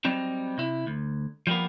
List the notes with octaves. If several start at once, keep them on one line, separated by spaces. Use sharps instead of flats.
F#3 G3 C4 D#4
C3 E4
D2
F3 G3 G#3 A#3 B3